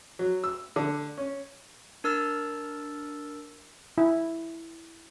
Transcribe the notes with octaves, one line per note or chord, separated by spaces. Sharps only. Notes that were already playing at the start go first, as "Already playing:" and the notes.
F#3
E6
D3
C#4
D4 A#4 E6 F6 A6
E4